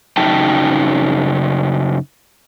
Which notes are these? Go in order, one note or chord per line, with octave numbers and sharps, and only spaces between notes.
F#2 C#3 F#3 D#4 G5 A5